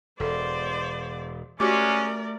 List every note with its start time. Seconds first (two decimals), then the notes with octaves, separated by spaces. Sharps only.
0.20 E1 A4 C5 D5
1.60 G#3 A3 C#4 F#4 G4 A#4 D5 D6